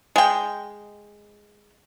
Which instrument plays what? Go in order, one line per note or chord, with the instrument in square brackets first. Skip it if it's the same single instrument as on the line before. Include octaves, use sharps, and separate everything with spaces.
[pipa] G#3 G5